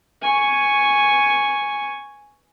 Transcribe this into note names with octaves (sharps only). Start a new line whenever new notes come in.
G#5 C#6